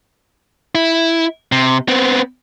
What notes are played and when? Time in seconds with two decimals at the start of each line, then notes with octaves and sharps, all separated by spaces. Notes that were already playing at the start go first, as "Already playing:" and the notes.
0.75 E4
1.52 C3
1.88 B3 C4